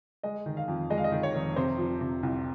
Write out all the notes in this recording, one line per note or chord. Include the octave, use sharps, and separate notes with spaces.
G#3 D#5
D#3
F5
F2
G#3 D#5
F5
D#5
D#3
C#5
F1
C3 C5
F3
C3
C2